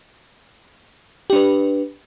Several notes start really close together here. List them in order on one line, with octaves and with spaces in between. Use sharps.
G4 D4 B4